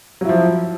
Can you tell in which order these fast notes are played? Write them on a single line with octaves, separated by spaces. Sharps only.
F#3 E4 F3